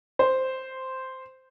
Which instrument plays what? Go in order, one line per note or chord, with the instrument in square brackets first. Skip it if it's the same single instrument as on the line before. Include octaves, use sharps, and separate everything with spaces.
[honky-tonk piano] C5